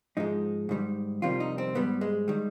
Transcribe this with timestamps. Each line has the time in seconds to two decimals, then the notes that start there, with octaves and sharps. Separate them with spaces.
0.17 G#2 F3 G#3 D#4
0.69 G#2 D#3 G3
1.22 F2 C3 D#3 G3 F4
1.40 D#4
1.58 C4
1.75 G#2 G3 B3
2.01 G#3
2.28 D#3 G3